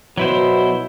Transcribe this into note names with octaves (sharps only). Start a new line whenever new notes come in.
B2 F#3 E4 C5